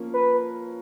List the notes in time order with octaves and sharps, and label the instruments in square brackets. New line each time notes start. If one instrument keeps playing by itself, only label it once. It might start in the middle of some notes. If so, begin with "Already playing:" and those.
Already playing: [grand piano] F3 A#3 C#4
[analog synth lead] B4